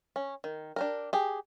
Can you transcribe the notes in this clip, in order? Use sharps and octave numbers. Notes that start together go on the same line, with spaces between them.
C#4
D#3
D4 G4 A#4
G4 G#4